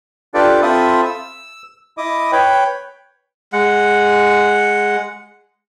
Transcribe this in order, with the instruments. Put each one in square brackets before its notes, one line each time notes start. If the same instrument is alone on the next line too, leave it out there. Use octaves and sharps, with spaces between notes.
[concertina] D4 F4 G4 A4 B4 D5
C4 F4 A4 E5 B5 D#6
E6
E4 D#5 D6 D#6
B4 C#5 G5 B5
[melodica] G#3 F#5